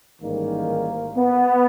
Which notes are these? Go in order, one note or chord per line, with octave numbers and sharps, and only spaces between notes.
A1 G#2 D#3 G3 A#3
B3